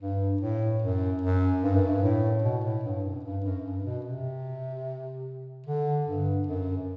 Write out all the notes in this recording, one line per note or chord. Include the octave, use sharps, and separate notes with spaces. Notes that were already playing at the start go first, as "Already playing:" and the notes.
G2
A2
F#2
F#2
G2
F#2
G2
A2
B2
A2
G2
F#2
G2
F#2
G2
B2
C3
D3
G2
F#2